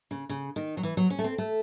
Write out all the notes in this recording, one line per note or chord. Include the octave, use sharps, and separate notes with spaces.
C#3
C#3
D#3
F#3
E3
F#3
C#4
A3
C4
A3